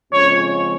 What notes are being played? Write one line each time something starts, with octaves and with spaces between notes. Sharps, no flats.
F2 C#3 F3 G#3 C#4 C#5